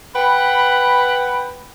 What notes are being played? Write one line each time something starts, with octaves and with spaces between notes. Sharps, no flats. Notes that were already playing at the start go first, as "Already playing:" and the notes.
B4 F#5 G5 B5